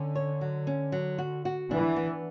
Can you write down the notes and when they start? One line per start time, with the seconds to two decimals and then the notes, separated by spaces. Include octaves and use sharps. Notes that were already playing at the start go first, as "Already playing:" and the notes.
Already playing: D3 C#4
0.15 C#5
0.41 F#3
0.67 C#4
0.92 F#3
1.18 F#4
1.45 F#4
1.71 E3 D4
1.96 B3